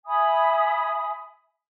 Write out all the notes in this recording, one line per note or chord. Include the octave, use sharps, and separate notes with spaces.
E5 G#5 B5 D#6